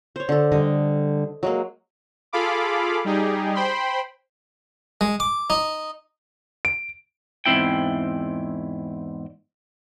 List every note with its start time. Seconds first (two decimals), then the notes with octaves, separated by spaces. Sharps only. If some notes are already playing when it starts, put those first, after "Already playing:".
0.16 C5 C#5
0.29 D3 A4
0.52 D3 G3 D#5
1.43 F#3 G#3 A#3
2.33 F4 G#4 A4 F5 B5 D6
3.05 G3 D#4 G4 G#4
3.55 C5 G5 B5 C6
5.01 G#3
5.20 D6
5.50 D#4
6.65 D7
7.46 E2 G#2 E3 C4 E4 G5